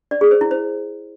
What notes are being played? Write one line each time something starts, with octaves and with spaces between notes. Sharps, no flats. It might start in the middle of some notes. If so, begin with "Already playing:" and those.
D5
G#4
C5
E4
C5